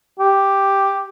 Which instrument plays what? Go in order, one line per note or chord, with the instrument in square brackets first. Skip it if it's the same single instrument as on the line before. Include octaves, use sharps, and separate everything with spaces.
[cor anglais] G4